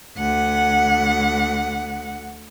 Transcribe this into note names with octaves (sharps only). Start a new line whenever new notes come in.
D2 F#5